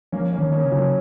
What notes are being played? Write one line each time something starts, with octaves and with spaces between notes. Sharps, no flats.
F3 A#3 C#4
A#3 C#4
D#3
A#3 C#4
C#3
F#3 A#3